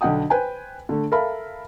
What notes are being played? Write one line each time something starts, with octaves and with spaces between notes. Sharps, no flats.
B1 D3 D#5 F#5 G5 D#6
B4 C5 G5 G#5
D3 A3
A4 A#4 E5 F5 A5 B5